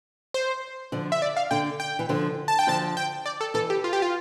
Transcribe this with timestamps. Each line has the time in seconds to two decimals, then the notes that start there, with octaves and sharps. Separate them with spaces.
0.34 C5
0.92 D3 F3
1.12 E5
1.22 D5
1.37 F5
1.51 D3 G5
1.80 G5
1.99 E3
2.09 D3 F3
2.48 A5
2.59 G5
2.67 D3 F3 A5
2.97 G5
3.26 D5
3.41 A4
3.54 E3 A4
3.70 G4
3.84 F4
3.93 G4
4.02 F4